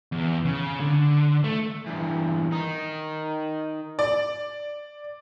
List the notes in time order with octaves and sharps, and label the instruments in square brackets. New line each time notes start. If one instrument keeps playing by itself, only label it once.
[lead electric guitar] E2
C#3
D3
A3
[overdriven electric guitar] E2 G2
D#3 D#4
[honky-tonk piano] D5